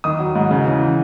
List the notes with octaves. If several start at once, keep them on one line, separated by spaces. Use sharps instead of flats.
D#3 D#6
F#3
G#2
C#3
E3